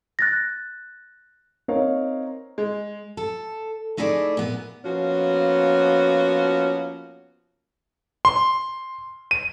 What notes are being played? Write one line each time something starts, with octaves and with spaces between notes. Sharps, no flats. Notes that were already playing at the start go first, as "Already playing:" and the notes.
F#6 A6 A#6
C4 D#4 A#4 C#5 F5
G#3
A4
A3 D#4 E4 G#4 C#5 D5
A#2 B3
F3 A#3 B3 C#4 F#4
C6
D#7